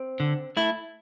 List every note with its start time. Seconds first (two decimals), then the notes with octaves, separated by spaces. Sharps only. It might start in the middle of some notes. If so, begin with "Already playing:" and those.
Already playing: C4
0.20 D3
0.57 A3 E4